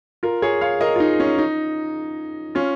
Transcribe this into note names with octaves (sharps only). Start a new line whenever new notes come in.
F4 A#4
G#4 C#5
C#5 F5
A#4 D#5
F4
D#4
C#4
D#4
C#4 F4